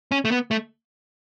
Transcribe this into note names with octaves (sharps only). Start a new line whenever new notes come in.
C#4
A3
B3
A3